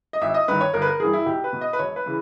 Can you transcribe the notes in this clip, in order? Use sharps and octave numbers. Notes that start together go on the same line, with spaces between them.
D#5
G#1 E5
D#5
G2 D#3 B4
C#5
G1 A#4
B4
A#4
G2 E3 G#4
E4
B1 G4
B4
B2
D#5
B4
E1 C#5
B4
C#3 E3